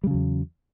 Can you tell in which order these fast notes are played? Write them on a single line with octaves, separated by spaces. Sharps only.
G3 C#3 F#3 E2